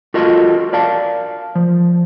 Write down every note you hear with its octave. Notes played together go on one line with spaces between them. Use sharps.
F4 F#4 A4 A#4 D#5
A#4 D5 F5 A5
F3